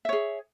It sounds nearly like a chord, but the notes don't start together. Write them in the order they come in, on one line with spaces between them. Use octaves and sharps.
E5 C#5 G#4